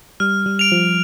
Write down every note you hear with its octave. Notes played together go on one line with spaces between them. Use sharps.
G3 F6
G3
D7 F7
F3